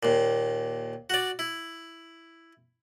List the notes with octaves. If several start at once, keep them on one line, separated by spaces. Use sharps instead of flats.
D#2 A#2
F#4 D5
E4